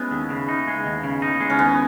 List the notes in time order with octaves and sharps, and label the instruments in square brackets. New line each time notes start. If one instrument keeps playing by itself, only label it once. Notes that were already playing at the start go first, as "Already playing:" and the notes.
Already playing: [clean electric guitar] G#3 [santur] B3 C#4 E4
[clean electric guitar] D#2
C#3
D#4
G#3
D#2
C#3
D#4
G#3
[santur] C#4
[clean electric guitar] D#2 [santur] B3